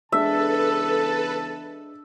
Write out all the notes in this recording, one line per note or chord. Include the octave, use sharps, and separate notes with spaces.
E2 C#3 G#3 D4 A4 B4 E5 A5